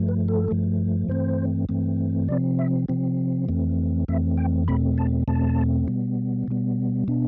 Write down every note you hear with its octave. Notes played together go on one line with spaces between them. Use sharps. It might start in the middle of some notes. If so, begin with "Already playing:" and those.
Already playing: G2 F3 A3
B4
A4
G2 F3 A3
G2 E3 A3 C4 C5
G2 E3 A3 C4
C3 F3 C4 D5
E5
C3 F3 C4
F2 E3 A3 C4
F2 E3 A3 C4 E5
G5
E2 B2 A3 C4 B5
A5
E2 B2 A3 C4 A5
B2 G3 B3
B2 G3 B3
B2 B3 D4